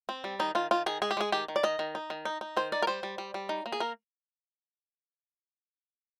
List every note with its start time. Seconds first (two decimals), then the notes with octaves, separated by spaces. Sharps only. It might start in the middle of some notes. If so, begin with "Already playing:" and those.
0.09 C4
0.24 G3
0.40 D#3 D#4
0.55 D#3 F4
0.71 D#3 F4
0.86 D#3 G#4
1.02 G#3 G#4
1.11 G4
1.17 G#3 G#4
1.32 D#3 G4
1.48 D#3
1.56 D5
1.63 D#3 D#5
1.79 D#3
1.95 D#4
2.10 D#3
2.25 D#4
2.41 D#4
2.57 D#3 C5
2.72 D#4 D5
2.82 A#4
2.87 G3 C5
3.03 G3
3.18 G3
3.34 G3
3.49 D#4
3.66 A#3
3.72 G#4
3.80 A#3 A#4